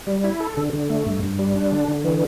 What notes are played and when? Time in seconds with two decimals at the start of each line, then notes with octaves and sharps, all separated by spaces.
0.07 G3
0.24 E4
0.40 A4
0.57 D3
0.73 D3
0.89 A3
1.06 G2
1.23 G2
1.39 G3
1.55 D4
1.72 D3
1.88 D3
2.05 E3